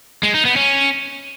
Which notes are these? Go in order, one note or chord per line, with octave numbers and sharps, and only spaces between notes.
G#3
D#4
B3
C#4